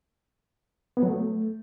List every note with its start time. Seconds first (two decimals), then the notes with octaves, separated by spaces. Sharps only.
0.97 B3
1.03 F#3
1.08 A3